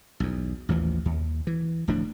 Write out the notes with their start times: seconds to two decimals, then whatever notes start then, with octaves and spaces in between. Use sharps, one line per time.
0.20 B1 E2
0.69 A1 D#2 E3 F3
1.05 D#2
1.47 E3
1.88 D1 A2 F3 D4